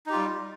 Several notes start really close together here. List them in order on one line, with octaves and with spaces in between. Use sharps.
D#4 G4 F4 G3